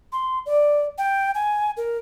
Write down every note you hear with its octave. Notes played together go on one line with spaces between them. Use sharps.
C6
D5
G5
G#5
A#4